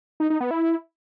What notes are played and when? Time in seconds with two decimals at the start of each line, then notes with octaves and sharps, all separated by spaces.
0.20 D#4
0.30 D#4
0.41 B3
0.51 E4